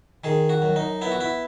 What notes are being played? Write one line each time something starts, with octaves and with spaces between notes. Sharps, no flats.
D#3 G#4
F#4
F#2
D#4
B3 E4
F#4
E4